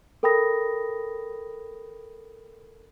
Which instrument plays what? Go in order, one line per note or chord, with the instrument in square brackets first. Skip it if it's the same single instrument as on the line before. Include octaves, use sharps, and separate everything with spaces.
[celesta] A4 A#4 G5 B5 D#6 A#6